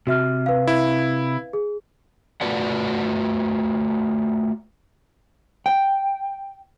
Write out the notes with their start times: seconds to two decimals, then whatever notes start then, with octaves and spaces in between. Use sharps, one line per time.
0.07 C3 F#4 E5 F6
0.46 B4 F5
0.67 E4
1.53 G#4
2.41 A3 F4 F#4 B4 D5 F#5
5.66 G5